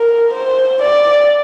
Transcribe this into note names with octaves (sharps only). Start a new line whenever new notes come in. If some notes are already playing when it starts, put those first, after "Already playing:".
Already playing: A#4
C5
D5